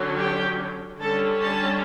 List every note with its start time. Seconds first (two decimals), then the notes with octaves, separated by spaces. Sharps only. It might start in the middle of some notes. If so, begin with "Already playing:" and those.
Already playing: D3 F#3 C#4
0.18 G4 G5
1.00 D3 G3 C#4 A4 A5
1.41 A4 A5